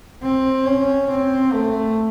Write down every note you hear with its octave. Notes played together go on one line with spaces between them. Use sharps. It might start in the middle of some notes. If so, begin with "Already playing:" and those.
C4
C#4
C4
A3